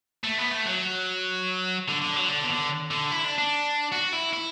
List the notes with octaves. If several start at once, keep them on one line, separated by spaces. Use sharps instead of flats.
A3
B3
A3
F#3
D3
D3
F#3
D3
B2
D3
D3
E4
D4
D4
F#4
E4
E4